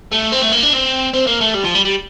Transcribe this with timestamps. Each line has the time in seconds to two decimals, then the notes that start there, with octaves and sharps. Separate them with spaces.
0.12 A3
0.32 C4
0.42 A3
0.52 A#3
0.63 D4
0.73 C4
1.13 C4
1.27 A#3
1.40 A3
1.54 G3
1.64 F3
1.75 G3
1.85 G3